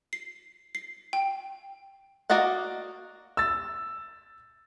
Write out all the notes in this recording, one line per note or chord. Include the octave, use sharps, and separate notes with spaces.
C7
C7
G5
A#3 F#4 D5 D#5 F#5
E6 A6